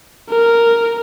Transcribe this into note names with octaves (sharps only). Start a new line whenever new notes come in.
A#4